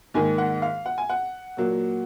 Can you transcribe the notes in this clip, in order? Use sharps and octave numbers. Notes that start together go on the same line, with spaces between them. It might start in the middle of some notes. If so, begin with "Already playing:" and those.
G#2 D#3 A#3 G#5
F#5
F5
F#5
G#5
F#5
A#2 F#3 A#3